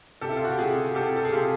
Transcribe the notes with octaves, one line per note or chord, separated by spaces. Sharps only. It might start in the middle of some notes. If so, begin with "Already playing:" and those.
C3 G4 A4
E4
F4
F#4
G4
C3 F#4 G#4
C3 G4 A4
A4
G#4
C3 F4 G4